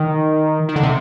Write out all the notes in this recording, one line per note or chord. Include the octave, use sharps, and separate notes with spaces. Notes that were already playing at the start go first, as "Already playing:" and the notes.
Already playing: D#3
D#3
D3
C3